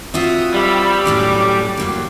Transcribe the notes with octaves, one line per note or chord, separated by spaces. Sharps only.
C4 F4 F#4 E5 D#6
G3 B5 E6
A2 F#3 C#4 D6
G2 F#3 A#3